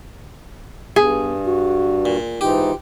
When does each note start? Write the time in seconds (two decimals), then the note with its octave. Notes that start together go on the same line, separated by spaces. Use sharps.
0.96 G2 B3 G#4
1.45 F#4
2.05 A#2
2.41 G#2 E3 D#4 F4 G4